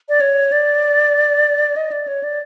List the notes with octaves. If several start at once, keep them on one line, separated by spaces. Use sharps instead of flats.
D5
C#5
D5
D#5
D5
C#5
D5